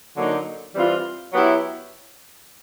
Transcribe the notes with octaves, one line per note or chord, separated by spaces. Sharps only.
D3 F#3 A#3 D#4
E3 G3 C4 F4
F#3 B3 E4 G4